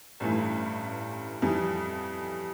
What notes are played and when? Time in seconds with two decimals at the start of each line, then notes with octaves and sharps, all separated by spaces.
0.20 A1 G2 E3 A3
1.42 F2 E3 G3